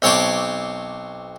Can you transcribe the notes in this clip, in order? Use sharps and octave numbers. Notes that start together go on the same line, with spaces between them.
B1 C4 C#5 A5 C6 D6